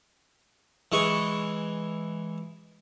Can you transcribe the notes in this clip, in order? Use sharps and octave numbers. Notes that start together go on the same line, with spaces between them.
E3 G#3 C#6